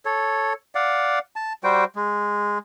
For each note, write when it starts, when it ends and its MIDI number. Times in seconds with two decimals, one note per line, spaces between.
0.05 0.53 69
0.05 0.53 73
0.75 1.19 74
0.75 1.19 77
0.75 1.19 78
1.36 1.53 81
1.64 1.84 55
1.64 1.84 66
1.64 1.84 72
1.64 1.84 79
1.96 2.58 56